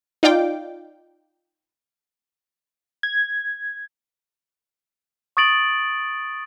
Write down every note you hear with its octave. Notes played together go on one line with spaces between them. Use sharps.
D#4 F4 D5 F5 G5 D6
G#6
C#6 D#6 A6 D7 F#7